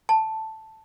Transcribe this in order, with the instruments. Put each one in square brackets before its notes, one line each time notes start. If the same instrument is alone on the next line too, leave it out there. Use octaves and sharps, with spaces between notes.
[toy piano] A5